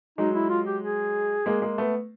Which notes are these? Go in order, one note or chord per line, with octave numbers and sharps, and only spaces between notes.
F#3 G#3 D#4
E4
F4
G4
G#4
G#3 A#3
G#3 A#3
A3 B3